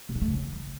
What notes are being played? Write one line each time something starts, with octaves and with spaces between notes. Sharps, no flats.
B2
G#3
A3
C#3
E3